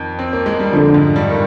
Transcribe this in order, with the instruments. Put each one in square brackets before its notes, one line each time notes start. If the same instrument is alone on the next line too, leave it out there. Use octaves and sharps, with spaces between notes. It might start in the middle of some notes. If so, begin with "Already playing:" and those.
Already playing: [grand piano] F2 D#3
C4
A#3
G#3
G3
[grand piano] F2 F3 [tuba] D3
[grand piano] G#2 G#3
G2 G3
D#3